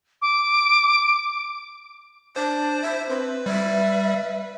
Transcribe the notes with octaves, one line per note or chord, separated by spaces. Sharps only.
D6
D4 C5 A5
E5
C4 B4
G3 E5